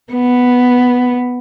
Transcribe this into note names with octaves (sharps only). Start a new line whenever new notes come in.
B3